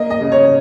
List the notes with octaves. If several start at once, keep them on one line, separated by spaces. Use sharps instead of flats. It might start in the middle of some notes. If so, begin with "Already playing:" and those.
Already playing: A#3 D#5
D#5
C#3
C#5